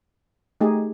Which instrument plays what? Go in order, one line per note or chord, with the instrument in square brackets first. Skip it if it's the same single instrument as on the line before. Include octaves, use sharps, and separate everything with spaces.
[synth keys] A3 [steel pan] D#4 G4 G#4